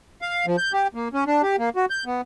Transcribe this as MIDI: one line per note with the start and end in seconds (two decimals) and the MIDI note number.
0.22 0.46 77
0.46 0.56 53
0.58 0.72 91
0.73 0.88 67
0.95 1.08 58
1.14 1.24 61
1.27 1.42 62
1.43 1.56 67
1.59 1.69 58
1.76 1.86 66
1.90 2.04 91
2.06 2.21 59